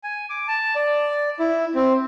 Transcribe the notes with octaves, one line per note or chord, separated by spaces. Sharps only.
G#5
D6
A5
D5
E4
C4